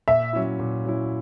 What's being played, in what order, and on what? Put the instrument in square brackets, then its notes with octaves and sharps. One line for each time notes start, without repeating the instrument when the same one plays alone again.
[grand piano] A#2 [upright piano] E5
[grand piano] F#3 C#4 E4
A#2
F#3 C#4 E4